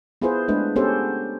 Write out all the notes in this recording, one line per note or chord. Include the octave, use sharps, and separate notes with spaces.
B3 E4 F4 G#4 B4 C5
G#3 A3 D4 B4
B3 C#4 G4 A4 C5